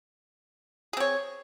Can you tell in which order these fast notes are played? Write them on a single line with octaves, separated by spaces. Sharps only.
G#4 C4 C#5